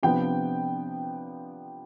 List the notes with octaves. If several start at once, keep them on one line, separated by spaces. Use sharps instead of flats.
C3 F3 B3 D4 G5